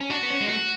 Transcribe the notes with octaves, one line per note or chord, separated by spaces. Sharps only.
C#4
D4 F#4
B3
C#4
G#3
A3 F#4